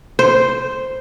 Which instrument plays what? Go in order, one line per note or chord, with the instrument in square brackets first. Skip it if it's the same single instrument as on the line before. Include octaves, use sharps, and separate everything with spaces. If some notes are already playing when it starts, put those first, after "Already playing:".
[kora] C5